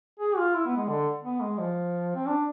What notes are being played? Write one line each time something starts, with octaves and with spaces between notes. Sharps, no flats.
G#4
F4
E4
B3
G#3
D3
B3
G#3
F3
C4
D4